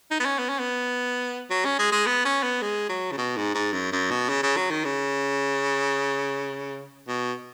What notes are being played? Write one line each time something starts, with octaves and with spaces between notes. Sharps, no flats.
D#4
B3
C#4
B3
C#4
B3
F#3
C#4
G#3
G#3
B3
C#4
B3
G#3
F#3
C#3
B2
G#2
G#2
F#2
F#2
B2
C#3
C#3
F#3
D#3
C#3
B2